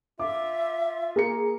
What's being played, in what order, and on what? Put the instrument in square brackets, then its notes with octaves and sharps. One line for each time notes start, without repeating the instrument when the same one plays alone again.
[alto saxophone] F4 [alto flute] E5 [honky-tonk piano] D6
[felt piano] A#3 A#4 C#7 [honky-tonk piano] G#4